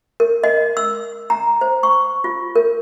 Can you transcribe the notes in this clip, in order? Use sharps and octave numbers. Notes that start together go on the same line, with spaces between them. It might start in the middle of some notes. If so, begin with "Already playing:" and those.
A#4
D#5
E6
A#5
C5
C#6
F4
A#4